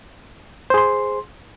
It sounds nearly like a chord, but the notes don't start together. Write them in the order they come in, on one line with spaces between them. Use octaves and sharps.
C5 G#4 C6